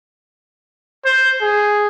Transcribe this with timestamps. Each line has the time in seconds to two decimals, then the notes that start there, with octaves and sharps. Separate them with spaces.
1.05 C5
1.42 G#4